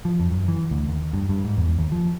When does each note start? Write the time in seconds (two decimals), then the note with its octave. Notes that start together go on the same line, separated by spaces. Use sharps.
0.05 F3
0.20 F2
0.31 F#2
0.48 E3
0.71 D2
0.89 D#2
1.13 G2
1.29 G2
1.45 G#2
1.57 E2
1.79 D#2
1.92 F3